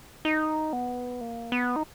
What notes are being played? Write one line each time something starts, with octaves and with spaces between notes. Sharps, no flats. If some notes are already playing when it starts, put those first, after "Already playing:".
D#4
B3
A#3
B3
D#4